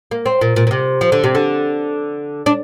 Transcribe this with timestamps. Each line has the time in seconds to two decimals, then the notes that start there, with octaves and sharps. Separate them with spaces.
0.11 A#3
0.26 C4
0.41 A#2
0.56 A#2
0.67 A#2
0.71 C3
1.01 F3
1.12 D3
1.24 C3
1.35 D3
2.46 D4